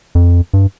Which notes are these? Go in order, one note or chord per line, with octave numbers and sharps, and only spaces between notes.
F2
G2